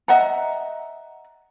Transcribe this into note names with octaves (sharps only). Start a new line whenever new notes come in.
D#5 E5 F#5 A#5